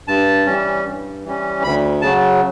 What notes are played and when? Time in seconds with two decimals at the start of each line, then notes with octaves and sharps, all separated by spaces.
0.08 G2 A5
0.46 E3 G3 C#4
0.85 G2
1.24 E3 G3 C#4
1.63 D2 B5
2.02 C#3 F#3 A5